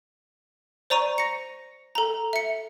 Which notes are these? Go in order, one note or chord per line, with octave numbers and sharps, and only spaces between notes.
C5 D5 A#5 C#6 D#7
A#6 C#7
A4 A#5
E5 C#7